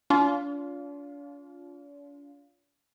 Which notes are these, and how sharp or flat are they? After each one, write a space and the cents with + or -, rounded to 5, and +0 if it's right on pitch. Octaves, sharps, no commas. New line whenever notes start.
D4 -45 F4 +5